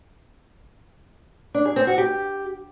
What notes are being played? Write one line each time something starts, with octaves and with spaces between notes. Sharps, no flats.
D4
G#4
C4
F#4
G4